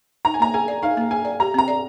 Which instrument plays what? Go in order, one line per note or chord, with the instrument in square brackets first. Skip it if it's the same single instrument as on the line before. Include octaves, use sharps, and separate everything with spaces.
[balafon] D#4 [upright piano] A#5
[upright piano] G#5
[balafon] A#3 [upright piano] A#5
[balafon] G#4 [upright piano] G#5
[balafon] D5
[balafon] D#4 [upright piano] F5
[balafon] A#3
[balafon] G#4 [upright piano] G#5
[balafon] D5
[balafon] G4 [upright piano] A#5
[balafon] C4 [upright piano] A#5
[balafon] D5